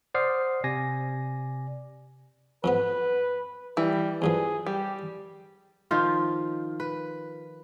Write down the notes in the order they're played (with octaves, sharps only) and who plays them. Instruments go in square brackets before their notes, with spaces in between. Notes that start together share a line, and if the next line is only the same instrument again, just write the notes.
[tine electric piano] C5 D5 F#5 D#6 F6 C7
C3 D5 G#5 A#6
[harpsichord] F2 G#2 B3 [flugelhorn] B4
[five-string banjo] E3 [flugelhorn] G3
[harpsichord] E2 G2 F3 [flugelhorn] G#4
[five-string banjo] G3 [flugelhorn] G4
[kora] D#3 F3 F4
B4